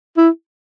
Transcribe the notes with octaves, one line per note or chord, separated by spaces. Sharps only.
E4